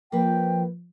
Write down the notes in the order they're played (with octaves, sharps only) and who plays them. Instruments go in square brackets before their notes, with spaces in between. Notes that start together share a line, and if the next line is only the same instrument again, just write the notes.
[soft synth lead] F3 [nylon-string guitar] A#3 B4 [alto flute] G5